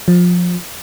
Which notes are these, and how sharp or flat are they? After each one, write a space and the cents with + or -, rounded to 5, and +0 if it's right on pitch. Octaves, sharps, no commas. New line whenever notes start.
F3 +20